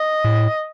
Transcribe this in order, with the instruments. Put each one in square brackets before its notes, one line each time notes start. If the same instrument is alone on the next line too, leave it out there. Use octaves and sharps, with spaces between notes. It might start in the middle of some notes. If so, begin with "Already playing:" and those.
Already playing: [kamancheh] D#5
[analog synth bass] A2